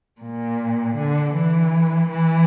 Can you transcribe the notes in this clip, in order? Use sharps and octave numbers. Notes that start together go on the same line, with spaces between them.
A#2
D3
E3
E3